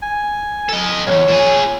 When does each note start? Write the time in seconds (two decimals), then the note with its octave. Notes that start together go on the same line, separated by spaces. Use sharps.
0.02 G#5
0.69 A4 D#5
1.07 B1 E2 C#5
1.28 A#2 G#4